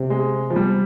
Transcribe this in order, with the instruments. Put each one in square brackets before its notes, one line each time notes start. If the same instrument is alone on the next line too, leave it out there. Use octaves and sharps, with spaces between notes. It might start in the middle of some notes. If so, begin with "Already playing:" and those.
Already playing: [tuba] C3
[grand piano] G#3
F3
G3